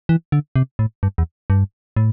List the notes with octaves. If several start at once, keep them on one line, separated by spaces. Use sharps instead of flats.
E3
D3
C3
A2
G2
E2
G2
A2